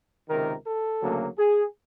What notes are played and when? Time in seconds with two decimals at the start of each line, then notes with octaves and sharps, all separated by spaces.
0.28 C#2 C3 D#3 A#4
0.65 A4
1.02 D2 C#3 F#3 A#3
1.38 G#4